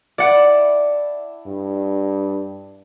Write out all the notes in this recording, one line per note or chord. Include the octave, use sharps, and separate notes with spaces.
D4 E4 D5 F#5
G2